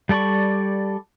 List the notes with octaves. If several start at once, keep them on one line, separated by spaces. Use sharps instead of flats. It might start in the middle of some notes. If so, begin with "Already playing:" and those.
G3 A4 D5 B5 C#6